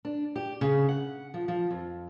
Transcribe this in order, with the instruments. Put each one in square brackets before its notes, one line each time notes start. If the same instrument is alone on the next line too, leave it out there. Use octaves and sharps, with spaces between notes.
[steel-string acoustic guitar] D4
G4
C#3
F#5
F3
F3
F2